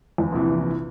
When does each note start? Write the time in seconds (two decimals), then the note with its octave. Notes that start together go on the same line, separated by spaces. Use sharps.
0.18 E2
0.32 A#1 C3 E3